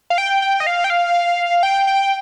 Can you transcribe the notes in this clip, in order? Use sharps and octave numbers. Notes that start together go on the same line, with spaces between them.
F5
G5
G5
D#5
F5
G5
F5
G5
G5